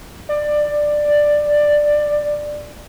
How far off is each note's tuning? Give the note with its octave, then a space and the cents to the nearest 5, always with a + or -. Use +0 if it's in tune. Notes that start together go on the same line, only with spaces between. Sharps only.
D5 +10